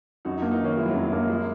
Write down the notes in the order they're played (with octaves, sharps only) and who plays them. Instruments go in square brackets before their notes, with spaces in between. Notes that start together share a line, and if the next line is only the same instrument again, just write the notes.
[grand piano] F#2 [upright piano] D#4 F#4
[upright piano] D#4 F#4
[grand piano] A#3
[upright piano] B3 D#4
[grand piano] D#3 [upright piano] A#3 C#4
[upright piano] G#3 [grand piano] E4
[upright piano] F#3
[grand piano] F#2 [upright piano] G#3
[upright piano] G#3
[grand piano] A#3
[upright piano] G#3
A#3